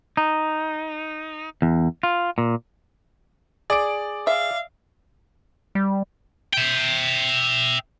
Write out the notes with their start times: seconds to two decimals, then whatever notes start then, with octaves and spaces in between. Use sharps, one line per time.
0.17 D#4
1.62 E2
2.03 F4
2.38 A#2
3.70 G#4 D5 D7
4.27 E5 F5
5.75 G3
6.53 E5 G5